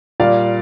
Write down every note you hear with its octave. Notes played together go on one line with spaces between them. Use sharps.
A#2 G3 D5 F5